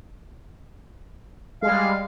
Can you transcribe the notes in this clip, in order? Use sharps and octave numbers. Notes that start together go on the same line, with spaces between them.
G3 G#3 F5